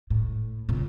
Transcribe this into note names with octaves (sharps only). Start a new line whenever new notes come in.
A2
C#2 A#2